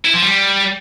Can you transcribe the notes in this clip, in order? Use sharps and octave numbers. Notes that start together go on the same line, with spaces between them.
E4
F3
G3